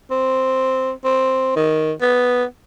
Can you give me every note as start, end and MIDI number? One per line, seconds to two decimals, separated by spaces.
0.11 0.91 60
1.05 1.52 60
1.56 1.92 51
2.01 2.44 59